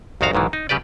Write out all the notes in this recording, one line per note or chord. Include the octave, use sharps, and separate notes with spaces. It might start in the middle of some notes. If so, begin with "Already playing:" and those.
C2 F2 D#3 F#4 F5 A#5
B1 G#2 D#3 E3
D#4
C#3 G3 G4 B4 D5